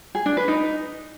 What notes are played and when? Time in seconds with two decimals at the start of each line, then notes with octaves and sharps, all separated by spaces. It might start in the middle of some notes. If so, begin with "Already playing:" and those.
0.15 G#4
0.26 D4
0.37 B4
0.48 D#4